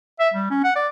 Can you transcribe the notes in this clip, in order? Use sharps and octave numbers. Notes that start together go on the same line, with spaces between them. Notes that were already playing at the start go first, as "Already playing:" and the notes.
E5
G3
C#4
F#5
D5